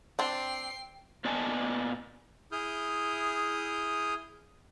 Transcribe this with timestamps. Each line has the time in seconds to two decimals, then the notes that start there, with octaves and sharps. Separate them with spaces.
0.19 C4 D4 G5 C7
1.25 A#2 B3 D5 D#5 G#5 A5
2.52 E4 G#4 D#6 F6 G6